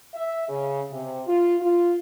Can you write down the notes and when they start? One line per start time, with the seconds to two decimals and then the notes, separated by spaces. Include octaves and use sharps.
0.14 E5
0.49 C#3
0.91 C3
1.26 F4
1.60 F4